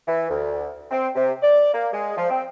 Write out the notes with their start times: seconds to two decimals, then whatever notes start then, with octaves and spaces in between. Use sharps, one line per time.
0.07 E3
0.30 D2
0.91 C4
1.15 C3
1.42 D5
1.74 A#3
1.93 G#3
2.17 F3
2.30 C4